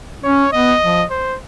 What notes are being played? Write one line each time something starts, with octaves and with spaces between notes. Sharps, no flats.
C#4 C#5
B3 D#5
F3
C5